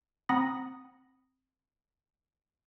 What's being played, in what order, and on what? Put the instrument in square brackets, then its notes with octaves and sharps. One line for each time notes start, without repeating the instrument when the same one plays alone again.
[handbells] C4 F#5 A#5 B5 D#6 A#6